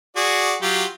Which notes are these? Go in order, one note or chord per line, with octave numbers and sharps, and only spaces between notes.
F#4 G#4 D5
F#3 F4 G4